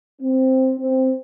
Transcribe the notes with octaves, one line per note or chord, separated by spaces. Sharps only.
C4
C4